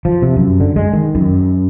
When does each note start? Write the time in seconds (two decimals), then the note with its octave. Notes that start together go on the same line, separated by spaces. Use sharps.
0.05 F3
0.22 C3
0.36 F#2
0.60 D3
0.76 G#3
0.93 D#3
1.15 F#2